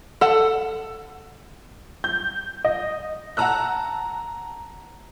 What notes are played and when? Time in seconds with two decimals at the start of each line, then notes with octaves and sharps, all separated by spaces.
0.21 A4 F#5
2.04 G6
2.64 D#5
3.37 F#5 A5 A#5 E6 F#6